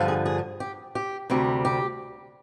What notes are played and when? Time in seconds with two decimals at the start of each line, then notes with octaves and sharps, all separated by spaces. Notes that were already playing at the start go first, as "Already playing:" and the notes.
Already playing: G2 D3 F3
0.08 G#4
0.26 G#4
0.60 G4
0.95 G4
1.30 D2 C3 G3
1.65 G4